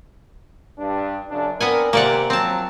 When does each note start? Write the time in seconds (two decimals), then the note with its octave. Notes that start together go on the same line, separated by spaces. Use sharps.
0.78 G2 D4
1.29 F#2 C#3 D4
1.61 B3 C4 D4 A#4 F#5 G#5
1.93 C3 A#3 D5 F#5
2.30 F3 F#3 C4 A5